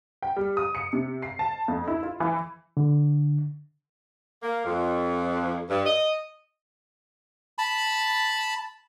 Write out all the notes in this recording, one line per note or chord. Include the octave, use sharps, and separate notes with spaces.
G5
G3
D#6
C#7
C3
C7
A5
F2
E4
F4
E3
D3
A#3
F2
G2
D#5
A5 B5